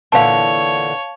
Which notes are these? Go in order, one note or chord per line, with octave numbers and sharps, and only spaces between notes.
A#2 D3 E3 C#5 F5 A5